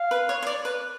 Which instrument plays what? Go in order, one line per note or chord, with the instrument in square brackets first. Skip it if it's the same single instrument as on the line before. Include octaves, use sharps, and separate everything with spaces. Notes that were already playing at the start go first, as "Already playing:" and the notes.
Already playing: [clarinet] F5
[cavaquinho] B4
C#5
C#5
D5
B4